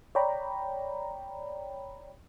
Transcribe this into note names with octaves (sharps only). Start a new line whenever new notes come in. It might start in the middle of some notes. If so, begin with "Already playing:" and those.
C#5 D5 G5 A#5 B5